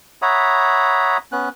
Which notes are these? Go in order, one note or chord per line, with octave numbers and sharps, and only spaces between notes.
C#5 E5 F#5 A#5 B5 D#6
B3 C#4 F#6